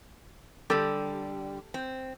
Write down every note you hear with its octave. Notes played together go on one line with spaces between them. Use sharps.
D3 G3 G4 A4
C4